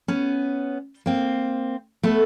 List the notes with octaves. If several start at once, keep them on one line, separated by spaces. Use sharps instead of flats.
B3 C#4
A#3 C4
A3 B3